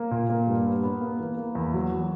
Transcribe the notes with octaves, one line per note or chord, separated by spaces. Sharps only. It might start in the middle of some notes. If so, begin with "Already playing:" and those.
Already playing: A#3
A#2
A#3
G2
B3
B3
A#3
E3
A#3
E2
F#3
F#3